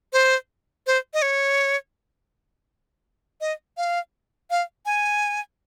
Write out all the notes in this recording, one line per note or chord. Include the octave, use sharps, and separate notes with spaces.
C5
C5
D#5
C#5
D#5
F5
F5
G#5